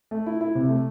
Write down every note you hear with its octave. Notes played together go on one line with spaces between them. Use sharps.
A3
E4
E4
C3
A3